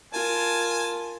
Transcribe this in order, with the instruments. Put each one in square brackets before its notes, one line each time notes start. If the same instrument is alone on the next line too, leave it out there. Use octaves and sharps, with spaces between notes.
[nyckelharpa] F4 A#4 [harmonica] G#5 A5